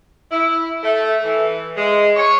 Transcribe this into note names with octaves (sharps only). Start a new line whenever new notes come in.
E4
A3
E3
G#3
C#5